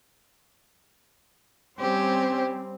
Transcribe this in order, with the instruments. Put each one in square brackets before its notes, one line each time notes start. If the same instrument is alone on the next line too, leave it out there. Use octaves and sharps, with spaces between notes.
[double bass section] G3 C4 [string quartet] C#4 G4 C5